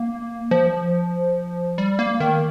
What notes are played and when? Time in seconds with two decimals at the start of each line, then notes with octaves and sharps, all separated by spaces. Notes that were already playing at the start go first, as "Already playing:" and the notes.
Already playing: A#3
0.51 F3
1.78 G3
1.99 A#3
2.20 D#3